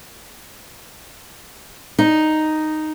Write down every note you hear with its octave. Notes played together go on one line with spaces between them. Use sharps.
D#4